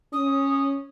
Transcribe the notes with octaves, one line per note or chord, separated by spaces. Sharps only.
C#4 D#6